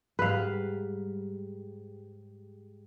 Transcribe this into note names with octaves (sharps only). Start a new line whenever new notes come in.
G#2 G3 B4 F5